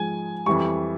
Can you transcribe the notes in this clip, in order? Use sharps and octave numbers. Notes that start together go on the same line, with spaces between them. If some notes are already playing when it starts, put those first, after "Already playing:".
Already playing: G#2 F3 G#3 G#5
F2 E3 G3 C#6